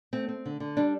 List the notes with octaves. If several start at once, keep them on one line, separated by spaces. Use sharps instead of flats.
A3 C4
C4
D3
D3
G3 D4